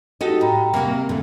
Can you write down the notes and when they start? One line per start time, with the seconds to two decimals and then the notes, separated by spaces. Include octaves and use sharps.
0.21 D#4 F#4 G4 A4 D#5
0.41 A2 G5 A#5 B5
0.74 C3 A#3 C4 F#4
1.09 F2 A#2 D3 A3